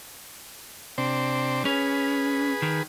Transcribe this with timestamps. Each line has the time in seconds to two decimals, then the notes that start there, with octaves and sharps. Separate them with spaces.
0.98 C3 C4 D4
1.65 C#4 G#4 B4
2.62 D#3